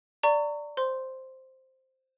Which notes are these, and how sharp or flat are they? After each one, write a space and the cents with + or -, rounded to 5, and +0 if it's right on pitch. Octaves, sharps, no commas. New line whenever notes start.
D5 +0 A#5 -30 C#6 +15
C5 +0 C6 +0